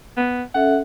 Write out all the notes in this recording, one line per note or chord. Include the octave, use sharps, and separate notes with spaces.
B3
C#4 A4 E5 F#5